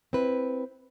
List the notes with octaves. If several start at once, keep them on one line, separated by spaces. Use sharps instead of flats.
C4 E4 B4